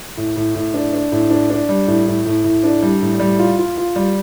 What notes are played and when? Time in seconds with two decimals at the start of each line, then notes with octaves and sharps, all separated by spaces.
0.17 A2
0.36 A2
0.55 A2
0.74 D4
0.93 D4
1.12 A2
1.30 D4
1.50 D4
1.69 G3
1.87 A2
2.06 A2
2.25 A2
2.44 A2
2.64 D4
2.82 G3
3.02 A2
3.20 G3
3.39 F4
3.58 F4
3.77 F4
3.96 G3